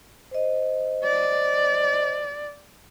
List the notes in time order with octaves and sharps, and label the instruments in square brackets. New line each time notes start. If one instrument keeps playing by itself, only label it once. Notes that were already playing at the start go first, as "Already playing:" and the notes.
[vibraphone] C5 D#5
[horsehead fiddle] D5